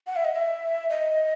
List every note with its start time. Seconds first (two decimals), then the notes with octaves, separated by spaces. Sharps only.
0.07 F#5
0.16 E5
0.25 D#5
0.33 E5
0.89 D#5